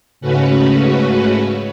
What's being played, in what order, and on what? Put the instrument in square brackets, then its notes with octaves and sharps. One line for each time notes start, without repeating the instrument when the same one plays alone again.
[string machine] G#2 C#3 A3 C#4 F#4 B4